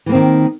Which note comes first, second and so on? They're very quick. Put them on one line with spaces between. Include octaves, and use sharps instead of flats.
E3 A#3 C4 D#3